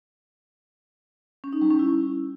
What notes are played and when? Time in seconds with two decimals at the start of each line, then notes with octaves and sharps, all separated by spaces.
1.44 C#4
1.53 D#4
1.61 G3
1.70 C#4
1.79 E4